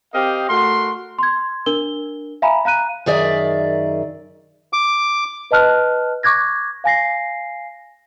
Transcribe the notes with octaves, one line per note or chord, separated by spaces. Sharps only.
C4 G4 A#4 D#5 F5
A3 F#4 A#4 C6
C6 G#6
D4 A#4 G7
E5 F5 G#5 A#5 B5
F5 A#5 F#6 D#7
F#2 D#3 G#4 D5 E5
D6
B4 D#5 A5 F6 F#6
C#6 D6 F#6 G#6 A#6
F5 G#5 A#6 C7